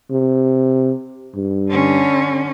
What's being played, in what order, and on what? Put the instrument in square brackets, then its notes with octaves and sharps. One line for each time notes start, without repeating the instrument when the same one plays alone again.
[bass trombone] C3
G2
[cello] D3 C#4